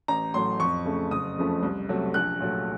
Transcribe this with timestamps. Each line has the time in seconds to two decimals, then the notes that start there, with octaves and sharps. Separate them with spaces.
0.08 A1 A#5
0.34 A2 F#3 A3 C6
0.60 F2 C#6
0.85 C#3 A3
1.11 F#1 D#6
1.37 F2 C#3 F3 A3
1.63 C2
1.89 C3 F#3 A3
2.14 A#1 F#6
2.40 A#2 F#3 A3